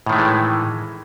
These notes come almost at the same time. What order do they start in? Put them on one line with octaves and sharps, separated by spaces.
A2 D#3 A3 G#3 E3